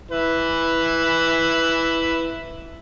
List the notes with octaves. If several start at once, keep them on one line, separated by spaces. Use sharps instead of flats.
E4 B4